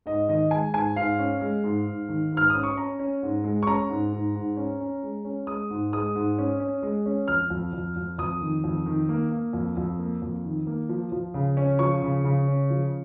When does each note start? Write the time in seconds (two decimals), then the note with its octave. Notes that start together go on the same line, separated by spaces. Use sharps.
0.06 G#2 D#5
0.29 D#3 D#5
0.51 G#3 G#5
0.74 G#2 G#5
0.96 G#2 F5
1.19 C#4
1.41 G#3
1.64 G#2
1.86 G#2
2.09 D#3
2.32 G#2 F6
2.50 C#4 D#6
2.63 C#6
2.77 C#4 A#5
2.99 C#4
3.23 G#2
3.44 G#3
3.63 C#6
3.67 C#4 A#5
3.90 G#2
4.13 G#2
4.35 G#2
4.57 C#4
4.81 C#4
5.03 G#3
5.25 C#4
5.47 G#3 D#6
5.70 G#2
5.93 G#3 D#6
6.15 G#2
6.39 C#4
6.60 C#4
6.82 G#3
7.06 C#4
7.28 F2 F6
7.50 F2
7.73 F2
7.96 F2
8.18 F2 D#6
8.41 D#3
8.64 F2
8.86 D#3
9.09 A#3
9.31 A#3
9.53 F2
9.77 F2
9.99 A#3
10.22 F2
10.44 D#3
10.67 A#3
10.89 F3
11.12 F3
11.34 C#3
11.57 C#4
11.79 F3 C#6
12.02 C#3
12.24 C#3
12.48 C#4
12.70 F3